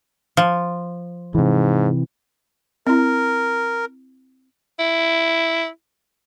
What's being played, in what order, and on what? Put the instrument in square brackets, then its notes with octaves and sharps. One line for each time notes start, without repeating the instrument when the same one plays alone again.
[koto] F3
[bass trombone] G#2 [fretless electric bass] C3 E3
[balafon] C4 E4 [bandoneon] A#4
[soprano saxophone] E4